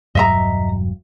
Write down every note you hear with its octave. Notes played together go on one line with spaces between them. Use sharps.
E1 G2 F#3 D#5 E5 A#5